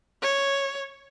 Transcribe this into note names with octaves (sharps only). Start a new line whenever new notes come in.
C#5